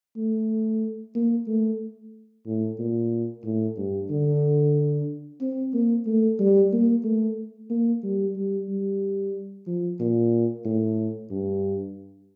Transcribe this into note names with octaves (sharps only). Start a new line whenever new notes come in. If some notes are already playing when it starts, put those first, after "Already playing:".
A3
A#3
A3
A2
A#2
A2
G2
D3
C4
A#3
A3
G3
A#3
A3
A#3
G3
G3
G3
F3
A#2
A2
G2